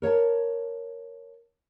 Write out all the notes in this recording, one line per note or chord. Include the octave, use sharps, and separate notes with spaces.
A#4 C#5 F5 A5